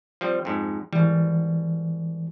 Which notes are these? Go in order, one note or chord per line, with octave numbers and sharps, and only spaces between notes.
F3 G3 C4
F2 G#2
G#1 E3 G3